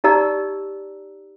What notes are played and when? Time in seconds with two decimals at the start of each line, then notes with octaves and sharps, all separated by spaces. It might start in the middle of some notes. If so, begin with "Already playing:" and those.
0.04 D#4 G4 D5 D#5 A#5 E6